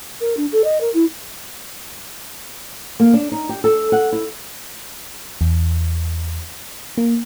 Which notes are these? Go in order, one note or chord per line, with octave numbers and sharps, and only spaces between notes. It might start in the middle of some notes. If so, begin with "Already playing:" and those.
A#4
D4
A4
D#5
A#4
E4
A#3
D4
D#4
G4
A4
F#5
E4
E2
A#3